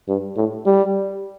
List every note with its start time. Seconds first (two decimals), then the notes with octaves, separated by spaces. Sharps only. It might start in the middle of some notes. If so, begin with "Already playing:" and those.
0.08 G2
0.37 A2
0.66 G3